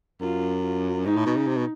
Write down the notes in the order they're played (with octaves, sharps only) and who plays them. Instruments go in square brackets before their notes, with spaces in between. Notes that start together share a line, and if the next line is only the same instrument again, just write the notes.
[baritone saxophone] F#2 [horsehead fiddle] F4
[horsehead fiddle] F4
[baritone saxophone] G#2 [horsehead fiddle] D#4
[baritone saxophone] A2
B2
C#3
C3
B2